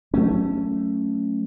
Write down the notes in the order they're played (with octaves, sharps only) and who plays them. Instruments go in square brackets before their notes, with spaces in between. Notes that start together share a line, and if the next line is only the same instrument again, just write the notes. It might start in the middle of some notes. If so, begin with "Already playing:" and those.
[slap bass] F#3 A3 C#4